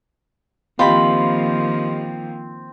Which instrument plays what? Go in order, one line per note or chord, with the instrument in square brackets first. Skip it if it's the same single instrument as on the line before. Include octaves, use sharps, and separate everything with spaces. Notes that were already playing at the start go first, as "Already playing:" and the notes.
[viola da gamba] D#3 F3 A#3 [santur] C4 [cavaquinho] F4 B5 [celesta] G4 D#5